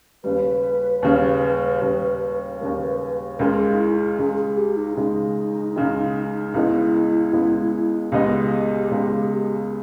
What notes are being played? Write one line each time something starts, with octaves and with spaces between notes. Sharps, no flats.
D#2 C#3 G3 B4
D#2 C#3 G3
D#2 C#3 G3
D#2 C#3 G3 A#4
B4
B4
C#2 C#3 G#3 A#4
G#4
D#4
E4
C#2 C#3 G#3 G#4
G#4
G4
D#4
C#2 C#3 G#3 D#4
C#2 C#3 G#3
C#2 C#3 G#3 B3 D#4 E4
C#2 C#3 G#3 B3 D#4
C#2 C#3 G#3 B3 D#4 G4
C#2 C#3 G#3 B3 D#4